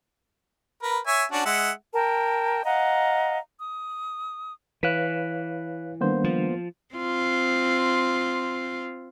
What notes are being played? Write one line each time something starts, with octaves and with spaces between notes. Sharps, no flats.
A#4 B4
C#5 E5 G#5
C#4 D4 F#4
G#3 E5 F#5
A#4 G5 A5
D#5 F5 F#5 A#5
D#6
E3 B4 C#5 F5 F#6 B6
D#3 G3 A#3 B3 D4 C5
F3
C4 F4